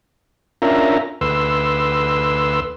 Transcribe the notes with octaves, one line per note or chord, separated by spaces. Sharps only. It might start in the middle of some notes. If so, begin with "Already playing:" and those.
C#4 D4 F4 A#4 E5 A#5
D2 B4 C6 E6